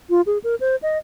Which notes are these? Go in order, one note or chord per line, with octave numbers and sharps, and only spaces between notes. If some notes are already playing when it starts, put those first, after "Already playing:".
F4
G#4
A#4
C5
D#5